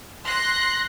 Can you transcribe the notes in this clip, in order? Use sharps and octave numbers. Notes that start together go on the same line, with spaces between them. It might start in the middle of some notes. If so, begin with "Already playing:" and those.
C6 F#6 A#6 C7